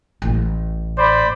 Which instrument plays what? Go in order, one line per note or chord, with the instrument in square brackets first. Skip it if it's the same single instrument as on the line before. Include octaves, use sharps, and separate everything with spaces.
[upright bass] A1 A2
[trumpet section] C5 D5 B5